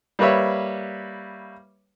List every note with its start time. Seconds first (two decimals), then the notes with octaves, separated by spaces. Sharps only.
0.19 G3 A#3 B4 C#5 E5